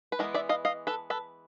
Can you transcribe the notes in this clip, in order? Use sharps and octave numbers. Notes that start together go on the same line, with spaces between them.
B4
E3 G#3 B3 A#4
D5 E5
D#5 F5
D#5 F5
A4 B4
A4 B4